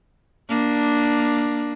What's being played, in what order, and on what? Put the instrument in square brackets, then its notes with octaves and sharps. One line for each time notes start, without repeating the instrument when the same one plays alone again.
[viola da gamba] A#3 D4